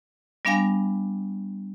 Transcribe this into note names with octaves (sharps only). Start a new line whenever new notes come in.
G3 B3 D4 F5 G#5 A#6